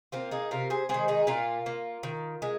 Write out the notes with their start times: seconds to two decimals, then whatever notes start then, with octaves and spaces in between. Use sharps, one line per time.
0.12 A#3 C4 F4
0.31 D#4 G#4
0.51 C3 F4 A#4
0.70 G#4 C5
0.89 D#3 G#3 G#4 C5
1.08 D#4 G#4
1.27 A#2 F4 A#4
1.66 A#3
2.03 D#3
2.42 G#3